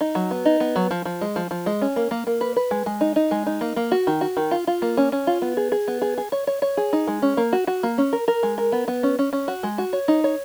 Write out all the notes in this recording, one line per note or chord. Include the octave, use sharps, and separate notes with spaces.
D#4
F#3
B3
D#4
B3
F#3
F3
F3
G#3
F3
F3
G#3
C#4
A#3
A#3
A#3
B4
B4
G#3
G#3
D#4
D#4
G#3
D#4
A#3
A#3
F#4
D#3
F#4
D#3
F4
F4
A#3
C#4
C#4
F4
B3
G#4
G#4
B3
G#4
G#4
C#5
C#5
C#5
G#4
D#4
G#3
C#4
A#3
F#4
F#4
A#3
C#4
A#4
A#4
G#3
A#4
B3
B3
C#4
C#4
C#4
F#4
G#3
F#4
C#5
D#4
C#5